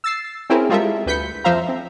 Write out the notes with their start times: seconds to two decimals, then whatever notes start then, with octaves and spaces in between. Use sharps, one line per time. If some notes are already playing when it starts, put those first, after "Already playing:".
0.04 E6 A6 C7
0.50 C4 C#4 E4 G#4 A#4
0.69 G3 G#3 F4 A4 A#4 E5
1.06 D2 B4 G6 B6 C#7
1.44 F2 F3 C5 E5 F5 A#5
1.68 C4